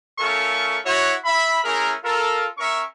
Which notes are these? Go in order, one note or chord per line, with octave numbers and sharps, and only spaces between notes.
A3 C#4 F4 A4 A#4 C#6
E4 F#4 C#5
E5 B5
A3 C#4 E4 G#4 A#4
F4 A4 A#4
C#4 A#4 E5 C#6